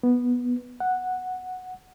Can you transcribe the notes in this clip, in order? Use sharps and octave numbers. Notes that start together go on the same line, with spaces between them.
B3
F#5